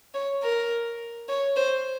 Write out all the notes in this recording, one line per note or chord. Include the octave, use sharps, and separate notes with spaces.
C#5
A#4
C#5
C5